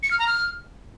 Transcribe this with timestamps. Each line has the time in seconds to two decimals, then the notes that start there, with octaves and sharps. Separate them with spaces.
0.03 C#7
0.11 F6
0.19 A#5
0.27 F6